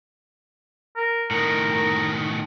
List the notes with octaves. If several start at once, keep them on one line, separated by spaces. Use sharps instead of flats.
A#4
A2 D#3 A#4